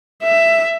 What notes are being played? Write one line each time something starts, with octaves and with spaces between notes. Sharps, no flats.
E5